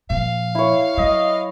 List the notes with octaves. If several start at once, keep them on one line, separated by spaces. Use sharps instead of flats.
A#2 F3 F5
E4 C#5
F#3 D#5